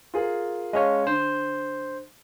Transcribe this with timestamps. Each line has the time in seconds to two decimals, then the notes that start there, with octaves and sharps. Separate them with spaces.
0.14 F4 G#4 A#4
0.73 G#3 C#4 C#5 D#5 F5 A5
1.07 D3 C5